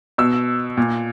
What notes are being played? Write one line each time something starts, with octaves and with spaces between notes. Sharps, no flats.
B2 E6
A#2